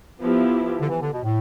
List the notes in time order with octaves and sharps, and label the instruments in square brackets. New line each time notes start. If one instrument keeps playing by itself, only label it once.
[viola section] F3 B3 E4 G4
[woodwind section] D3
E3
D3
B2
A2